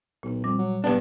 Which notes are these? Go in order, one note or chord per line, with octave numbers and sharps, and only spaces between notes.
B1 A#2
F2 G3 D6
F#3
F#1 G2 B3 D4